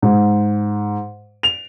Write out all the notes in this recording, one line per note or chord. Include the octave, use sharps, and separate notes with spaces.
G#2
F7